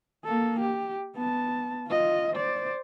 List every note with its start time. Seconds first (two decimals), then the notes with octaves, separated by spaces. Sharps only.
0.25 A#3 A4
0.59 G4
1.16 B3 A5
1.88 F4 D#5
2.35 C5 D5